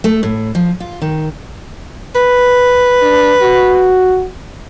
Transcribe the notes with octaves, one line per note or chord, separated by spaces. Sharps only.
A3
A2
F3
F4
D#3
B4
D4
F#4